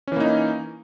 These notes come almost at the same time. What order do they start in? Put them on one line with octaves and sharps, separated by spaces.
C#4 E3 A#3 D#4